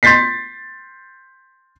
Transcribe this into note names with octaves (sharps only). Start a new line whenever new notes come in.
C6 G6 A6 B6 C7